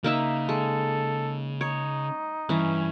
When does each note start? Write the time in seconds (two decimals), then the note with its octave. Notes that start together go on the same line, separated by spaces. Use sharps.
0.04 C#3 A#3 D#4 E5
0.49 G#3 A4
1.61 D#4 C#5
2.49 G2 E3 C#4